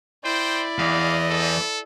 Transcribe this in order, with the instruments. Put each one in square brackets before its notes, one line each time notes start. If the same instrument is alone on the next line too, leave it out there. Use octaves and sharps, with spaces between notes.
[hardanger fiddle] E4 D5 [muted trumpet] C5 [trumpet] G5
[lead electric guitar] E2 [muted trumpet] D#5 [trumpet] F5
[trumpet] A4